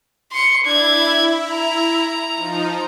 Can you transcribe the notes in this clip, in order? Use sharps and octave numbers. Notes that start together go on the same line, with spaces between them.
C6 C#7
D4 E4 G#6
A#5
F3 D#4